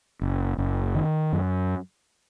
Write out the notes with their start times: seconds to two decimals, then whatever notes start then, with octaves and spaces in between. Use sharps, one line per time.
0.21 F#1
0.58 F#1
0.95 D#3
1.33 F#2